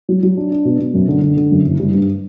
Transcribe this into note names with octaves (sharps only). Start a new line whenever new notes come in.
F#3
F#3
D4
D4
B2
B2
F#2
D3
D3
D3
F#2
F#1
G3
G2